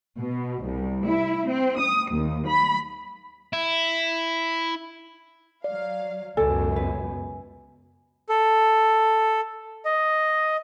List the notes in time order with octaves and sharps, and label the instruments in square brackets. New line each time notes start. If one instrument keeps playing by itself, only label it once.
[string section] B2
C2
E4
C4
D#6
D#2
B5
[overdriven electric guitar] E4
[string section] F#3 F5 [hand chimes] D5
[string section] C#2 F#2 B2 [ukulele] A4 D5 [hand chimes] G#5
[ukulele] B4
[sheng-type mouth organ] A4
D#5